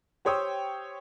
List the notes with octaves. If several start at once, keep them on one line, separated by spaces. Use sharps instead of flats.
G4 C5 C#5 G5 D#6 E6